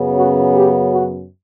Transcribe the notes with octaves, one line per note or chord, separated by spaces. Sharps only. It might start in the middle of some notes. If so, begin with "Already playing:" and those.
Already playing: F#2 C#3 F#3 B3
F#4
G4
F#4